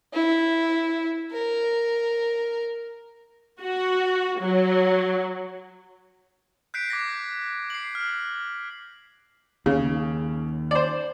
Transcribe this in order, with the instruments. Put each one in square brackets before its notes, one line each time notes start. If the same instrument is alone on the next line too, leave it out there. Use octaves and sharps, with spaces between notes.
[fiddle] E4
A#4
[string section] F#4
F#3
[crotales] F#6 G6 B6 C7 D7
D6 G#6 A#6 B6
C7 F#7
F6
[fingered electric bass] D#2 [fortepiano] C#3
[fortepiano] C5 D5